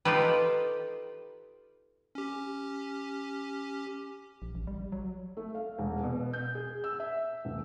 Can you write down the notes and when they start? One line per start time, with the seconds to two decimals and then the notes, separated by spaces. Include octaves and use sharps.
0.05 D#4 F4 G4 A4 B4
2.15 C#4 G4
4.42 A#1
4.55 A1
4.67 G3
4.92 F#3
5.37 A3
5.55 F5
5.78 E1
6.03 B2
6.33 G6
6.55 G#4
6.84 E6
7.00 E5
7.45 D#1